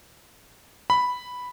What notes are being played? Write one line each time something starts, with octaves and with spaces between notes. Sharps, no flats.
B5